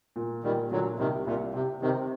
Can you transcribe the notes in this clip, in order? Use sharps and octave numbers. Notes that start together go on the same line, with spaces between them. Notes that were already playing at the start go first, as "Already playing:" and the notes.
A#2
A#2 D#3 G3
A#2 D3 F#3
C2 C3 D#3
C2 A#2
C3 G4
C3 D#3 C4